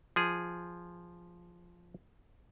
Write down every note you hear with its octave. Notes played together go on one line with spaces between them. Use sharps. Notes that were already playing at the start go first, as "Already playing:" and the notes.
F3 G#4